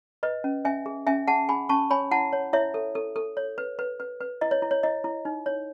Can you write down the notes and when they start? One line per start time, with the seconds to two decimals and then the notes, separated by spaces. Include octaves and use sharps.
0.23 B4 D#5
0.44 C#4
0.65 C#4 E5 G#5
0.86 G#4
1.07 C#4 E5 G#5
1.28 G#4 F#5 A5
1.49 G#4 G#5 B5
1.69 C#4 A5 C#6
1.90 C#5 G#5 B5
2.11 E4 F#5 A5
2.33 C#5
2.53 E4 C#5 E5
2.74 A4
2.95 A4
3.16 A4
3.37 C#5
3.58 B4
3.79 B4
4.00 B4
4.20 B4
4.41 E4 D#5
4.51 C#5
4.62 E4
4.71 C#5
4.83 E4 D#5
5.04 E4
5.25 D#4
5.46 C#5